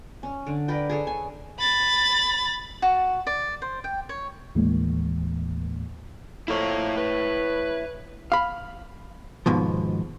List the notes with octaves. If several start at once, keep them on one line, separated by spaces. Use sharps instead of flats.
C#4
D3
A#4 B4 D5 G5
G#4 A4 C#5
G#5
B5 A6
F#4
D5
C5
G5
C#5
D#2 A2 E3 G#3 A#3
F2 A#3 E4 C#5
B4
F5 B5
D#2 G#2 B2 F3